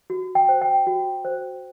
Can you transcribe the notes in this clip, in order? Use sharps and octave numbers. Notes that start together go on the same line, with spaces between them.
F#4
G5
C5
G5
F#4
C5